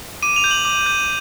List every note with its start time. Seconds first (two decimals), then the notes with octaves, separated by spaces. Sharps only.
0.23 D6 D#7
0.36 F7
0.44 G6
0.51 F#7
0.65 D6
0.86 G6